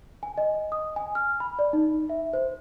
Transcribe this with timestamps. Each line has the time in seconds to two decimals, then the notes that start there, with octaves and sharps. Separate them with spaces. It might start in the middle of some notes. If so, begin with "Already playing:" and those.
0.23 G#5
0.38 D#5
0.72 D#6
0.96 G#5
1.15 F6
1.40 B5
1.59 D5
1.73 D#4
2.09 E5
2.33 C5